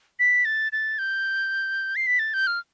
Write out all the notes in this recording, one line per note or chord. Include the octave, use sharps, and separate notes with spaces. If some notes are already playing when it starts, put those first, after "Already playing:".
B6
A6
A6
G6
C7
B6
A6
G6
F6